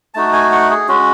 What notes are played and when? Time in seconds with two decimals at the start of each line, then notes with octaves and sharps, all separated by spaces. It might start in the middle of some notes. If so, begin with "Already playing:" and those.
0.14 A3 D#4 F#4 A5
0.33 G#5
0.52 F#5
0.71 G#4
0.88 G#3 C#4 F#4